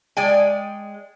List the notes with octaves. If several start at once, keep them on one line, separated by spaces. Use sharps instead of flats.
G#3 D5 G5 G#5